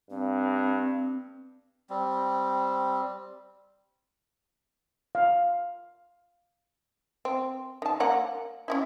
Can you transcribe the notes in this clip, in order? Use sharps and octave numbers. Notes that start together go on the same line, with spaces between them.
G2 C4
G3 C4
F5
C4
D#3 A5
A#3 F#5 A#5
C#4 D#4 E4